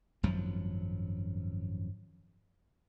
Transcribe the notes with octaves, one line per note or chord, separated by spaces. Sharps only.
G#1 F#2 F3 F#3